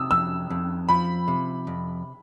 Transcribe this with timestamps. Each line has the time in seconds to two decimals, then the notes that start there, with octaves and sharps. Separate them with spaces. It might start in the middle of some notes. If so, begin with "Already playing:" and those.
Already playing: C3 D#6 E6
0.11 F2 E6
0.50 F2
0.89 F3 B5
1.28 C3
1.67 F2